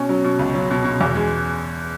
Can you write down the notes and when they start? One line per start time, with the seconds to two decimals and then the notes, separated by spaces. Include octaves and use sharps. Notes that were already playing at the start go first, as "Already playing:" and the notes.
Already playing: B2 C#4
0.09 F#3
0.24 B2
0.39 C#2
0.54 F#3
0.70 B2
0.84 B2
1.01 E2
1.15 G#3